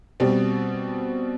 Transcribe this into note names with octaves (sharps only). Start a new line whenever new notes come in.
B2 G3 C4